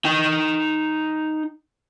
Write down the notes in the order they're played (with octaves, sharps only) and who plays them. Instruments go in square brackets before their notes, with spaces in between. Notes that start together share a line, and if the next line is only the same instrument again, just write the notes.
[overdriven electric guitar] D#4 G5